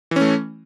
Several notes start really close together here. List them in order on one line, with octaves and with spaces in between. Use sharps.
E3 C#4 A3